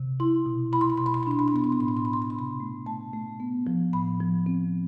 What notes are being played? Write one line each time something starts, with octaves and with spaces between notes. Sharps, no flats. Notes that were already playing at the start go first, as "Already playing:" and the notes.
Already playing: C3
E4 C6
B2
E4 B5
C6
B5
B2 C6
B5
C6
B5
D4 C6
B5
C6
B3 B5
C6
B5
A2 C6
B5
C6
A2 B5
C6
B5
C3 C6
B5
A3
A3 A5
A3
B3
F3
A2 B5
F3
C4